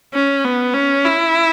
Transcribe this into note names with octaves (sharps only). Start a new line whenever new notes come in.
C#4
B3
C#4
E4